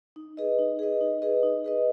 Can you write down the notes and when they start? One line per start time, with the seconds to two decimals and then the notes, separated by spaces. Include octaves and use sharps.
0.16 D#4
0.37 G#4 B4 D#5
0.59 D#4
0.79 G#4 B4 D#5
1.01 D#4
1.22 G#4 B4 D#5
1.43 D#4
1.64 G#4 B4 D#5